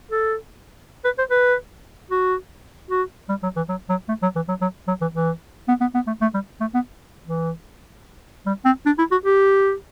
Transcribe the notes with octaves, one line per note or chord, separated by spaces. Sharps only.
A4
B4
C5
B4
F#4
F#4
G3
F#3
E3
F#3
F#3
A3
F#3
E3
F#3
F#3
F#3
E3
E3
B3
B3
B3
A3
A3
G3
A3
B3
E3
G3
C4
D4
E4
F#4
G4